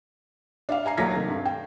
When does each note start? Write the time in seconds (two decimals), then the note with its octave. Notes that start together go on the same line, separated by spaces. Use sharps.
0.69 D4 E5 F5
0.85 E5 G#5 A#5 C7
0.97 D#2 F#3 A3 G#6 A#6 B6
1.15 C3 D#3 A3
1.29 G2
1.45 G5